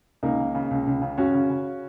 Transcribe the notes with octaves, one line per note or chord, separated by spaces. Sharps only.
C#2 A#3 D#4
C#3
C#3
C#2
C#2
C#3
F#2 C#4 F#4
C#3
C#3